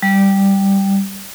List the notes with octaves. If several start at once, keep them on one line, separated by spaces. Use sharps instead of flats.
G3